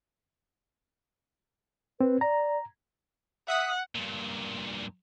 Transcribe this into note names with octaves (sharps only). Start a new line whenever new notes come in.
C4 B4
D5 A#5
E5 F#5 D#6 B6
G2 A#2